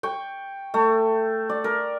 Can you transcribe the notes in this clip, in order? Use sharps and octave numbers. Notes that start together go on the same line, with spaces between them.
G5 C#6
A3
D5
A#4